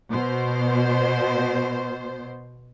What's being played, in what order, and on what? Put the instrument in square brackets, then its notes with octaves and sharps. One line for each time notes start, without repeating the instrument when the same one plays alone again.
[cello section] B2 C5